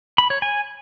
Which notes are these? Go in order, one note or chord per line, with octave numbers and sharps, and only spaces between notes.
B5
C#5
G#5